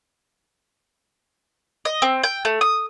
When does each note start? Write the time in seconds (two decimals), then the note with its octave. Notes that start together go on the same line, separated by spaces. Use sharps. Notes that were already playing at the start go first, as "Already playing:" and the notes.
1.85 D#5
2.02 C4
2.24 G5
2.45 A3
2.61 D#6